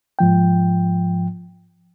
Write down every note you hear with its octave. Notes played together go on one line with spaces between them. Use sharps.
G#2 F3 G5